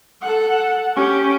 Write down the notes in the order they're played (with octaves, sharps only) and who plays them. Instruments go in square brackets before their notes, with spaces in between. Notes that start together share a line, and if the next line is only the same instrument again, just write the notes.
[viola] A4 F#5
C#4 G4